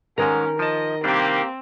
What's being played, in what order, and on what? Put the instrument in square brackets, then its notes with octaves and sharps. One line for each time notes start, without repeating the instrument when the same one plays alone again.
[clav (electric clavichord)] G#2 G#3 A#5 [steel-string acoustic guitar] D#3 A#4 [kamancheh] C#4
[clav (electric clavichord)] F3 A5 [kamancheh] D#5
[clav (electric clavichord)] C3 G3 D4 [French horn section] A#3 G4 [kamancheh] C4